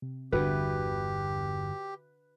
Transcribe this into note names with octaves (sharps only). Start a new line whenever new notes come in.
C3
G1 E2 D3 F#4 G4 B4 E5